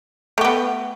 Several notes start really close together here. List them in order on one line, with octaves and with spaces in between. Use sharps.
A3 G4 B3